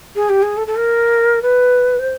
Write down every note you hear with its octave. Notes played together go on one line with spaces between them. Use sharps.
G#4
G4
G#4
A4
A4
A#4
B4
C5